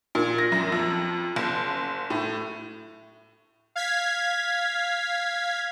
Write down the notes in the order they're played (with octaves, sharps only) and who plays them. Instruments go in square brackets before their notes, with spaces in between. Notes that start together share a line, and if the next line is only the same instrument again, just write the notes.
[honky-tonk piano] A#2
A#6
F#2
F2
F#1
A2
[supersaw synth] F5 G#6 B6